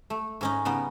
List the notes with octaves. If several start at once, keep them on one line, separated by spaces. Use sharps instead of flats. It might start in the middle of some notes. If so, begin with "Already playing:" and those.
A3
G#2 C#4 D#4
C#3 G3 B3 D#4